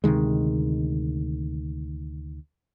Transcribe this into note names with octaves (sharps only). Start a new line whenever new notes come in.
D2 C3 D#3 G#3